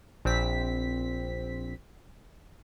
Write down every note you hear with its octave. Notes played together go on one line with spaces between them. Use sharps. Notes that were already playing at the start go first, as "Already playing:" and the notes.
A#1 C4 B6